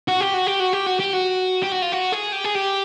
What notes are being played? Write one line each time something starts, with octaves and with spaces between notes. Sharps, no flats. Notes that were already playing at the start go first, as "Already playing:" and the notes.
F#4
G4
F#4
G4
F#4
G4
F#4
G4
F#4
G4
F#4
F4
F#4
G#4
G4
G#4
G4